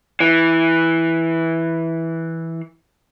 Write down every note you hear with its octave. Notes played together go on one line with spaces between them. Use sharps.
E3